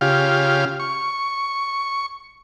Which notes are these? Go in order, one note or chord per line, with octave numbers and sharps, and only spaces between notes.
C#3 F4 G4 F5
C#6